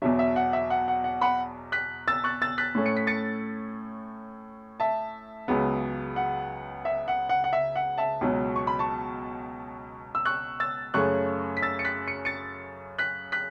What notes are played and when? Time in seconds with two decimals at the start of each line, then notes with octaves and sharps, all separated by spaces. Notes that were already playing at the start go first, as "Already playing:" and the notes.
0.02 E2 B2 F#3 E5
0.19 E5
0.36 F#5
0.53 E5
0.70 F#5
0.88 F#5
1.04 F#5
1.21 F#5 B5
1.72 F#6 B6
2.08 E6 A6
2.24 C#6 F#6
2.42 E6 A6
2.58 F#6 B6
2.75 A2 A3 C#4
2.86 C#7
2.97 B6
3.07 A6 C#7
4.80 E5 A5
5.48 C#2 C#3 F#3 B3
6.16 F#5
6.85 E5
7.08 F#5
7.29 F#5
7.44 F#5
7.53 E5
7.76 F#5
7.98 E5 A5
8.21 C#2 B2 F#3
8.56 C#6
8.67 B5
8.79 A5 C#6
10.15 E6
10.25 C#6 F#6
10.60 E6 A6
10.94 F#2 C#3 A3 C#4 C#6 F#6
11.57 B6
11.62 E6 A6
11.79 C#7
11.85 F#6 B6
12.08 C#7
12.25 A6 C#7
12.99 F#6 B6
13.32 F#6 B6